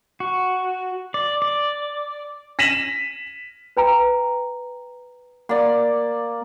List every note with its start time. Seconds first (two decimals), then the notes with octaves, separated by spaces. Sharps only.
0.20 F#4
1.14 D5
1.42 D5
2.59 A#6 B6 D#7 E7 F#7
3.77 B4 G5 A#5
5.49 A#3 D5 F#5